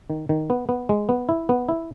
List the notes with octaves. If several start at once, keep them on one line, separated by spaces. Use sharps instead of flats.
D#3
D#3
B3
B3
G#3
B3
E4
B3
E4